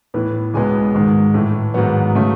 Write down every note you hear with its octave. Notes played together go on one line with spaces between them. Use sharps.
A2 E3 B3
C#2 B2 G#3 B3 G#5
G#2 D#3 G#3
A2 E3 A3
G#2 D#3 F#3 B3 F#5
C#3 F#3 A3